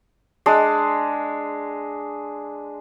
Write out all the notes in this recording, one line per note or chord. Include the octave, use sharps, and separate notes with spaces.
G#3 D4